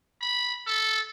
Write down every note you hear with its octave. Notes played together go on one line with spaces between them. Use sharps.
B5
A4